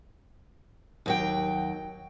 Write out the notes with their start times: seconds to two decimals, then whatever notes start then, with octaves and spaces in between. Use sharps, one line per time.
1.06 D#2 F#3 G5